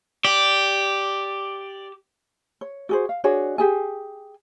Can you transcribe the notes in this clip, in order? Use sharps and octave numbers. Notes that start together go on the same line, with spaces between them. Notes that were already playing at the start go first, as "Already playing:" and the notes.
G4 D5
C#5
F#4 G#4 C5
F5
D4 F#4 G#4 C#5
G4 G#4 G#5